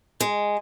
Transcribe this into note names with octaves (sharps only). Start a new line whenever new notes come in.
G#3